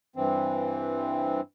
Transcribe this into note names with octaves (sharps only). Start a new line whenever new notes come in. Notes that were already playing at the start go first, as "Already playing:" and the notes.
G2 E3 C4